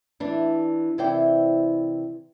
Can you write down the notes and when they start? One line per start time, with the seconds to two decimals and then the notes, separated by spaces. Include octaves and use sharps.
0.20 E3 D4
0.98 C3 E3 E4 C5 D5 G5